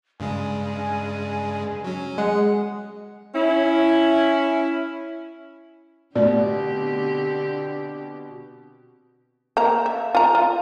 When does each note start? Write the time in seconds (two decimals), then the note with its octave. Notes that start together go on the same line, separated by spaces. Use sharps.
0.20 G2 C#3 G#3 G#5
1.84 F#3 C#4
2.18 G#3 F#5
3.35 C#4 E4
6.16 B2 D3 A3 C4 G4 D5
9.57 A#3 A#5
9.86 E5
10.15 F4 A#5
10.35 F4